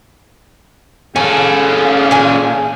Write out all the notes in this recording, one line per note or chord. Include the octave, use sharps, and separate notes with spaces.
C#4 G#4 A4 F5 G#5
A#2 G#5